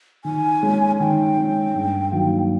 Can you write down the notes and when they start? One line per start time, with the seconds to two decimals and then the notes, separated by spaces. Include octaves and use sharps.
0.24 D#3 G#5
0.63 G#3 C#4
1.00 D#3 G5
1.37 G#3 C#4
1.74 G2
2.11 D#3 F#3 A#3